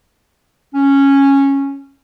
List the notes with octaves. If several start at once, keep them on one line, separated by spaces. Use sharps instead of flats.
C#4